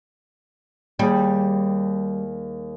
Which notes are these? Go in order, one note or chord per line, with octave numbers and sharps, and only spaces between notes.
D#2 G3 G#4